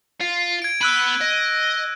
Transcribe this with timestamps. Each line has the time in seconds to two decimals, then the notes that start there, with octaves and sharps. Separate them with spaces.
0.21 F4
0.62 G#6 D7
0.81 B3 B5 E6 F#6 D#7
1.21 D#5